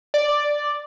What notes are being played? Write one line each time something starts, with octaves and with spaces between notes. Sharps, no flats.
D5